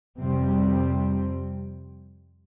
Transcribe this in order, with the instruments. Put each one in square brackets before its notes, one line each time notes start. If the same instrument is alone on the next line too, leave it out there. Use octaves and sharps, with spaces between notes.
[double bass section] F2 C3 G3 C4